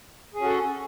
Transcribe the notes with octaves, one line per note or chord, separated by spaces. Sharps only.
C#4 F#4 G#4 A4